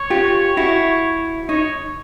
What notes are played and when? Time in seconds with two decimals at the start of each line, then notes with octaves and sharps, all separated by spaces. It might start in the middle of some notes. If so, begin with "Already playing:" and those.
Already playing: C#5
0.10 F4 G4
0.57 E4 F#4
1.49 D#4 C#5